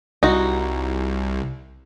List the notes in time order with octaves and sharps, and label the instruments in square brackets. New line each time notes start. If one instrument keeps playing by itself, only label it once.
[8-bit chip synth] C2 [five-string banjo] D#4 F#4